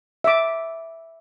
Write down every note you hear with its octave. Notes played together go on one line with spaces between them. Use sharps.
E5 D6